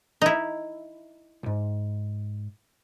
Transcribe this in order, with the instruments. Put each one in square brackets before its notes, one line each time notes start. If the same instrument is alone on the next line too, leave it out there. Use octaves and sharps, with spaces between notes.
[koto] D#4 E4
[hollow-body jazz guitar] B1 G#2